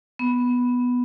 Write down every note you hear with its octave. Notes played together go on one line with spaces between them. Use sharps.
B3